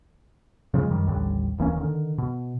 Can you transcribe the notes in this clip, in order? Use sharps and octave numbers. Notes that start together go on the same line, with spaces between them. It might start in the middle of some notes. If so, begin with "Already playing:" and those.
C#3 F3 G3 G#3
F#2 D#3 G3
A1 D#2 D3 G3
D#1 E3 A#3 C#4
D3 D#3
B2